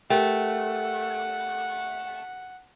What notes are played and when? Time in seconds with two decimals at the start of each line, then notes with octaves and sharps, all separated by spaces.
0.10 A3 G4 A#4 F#5 G5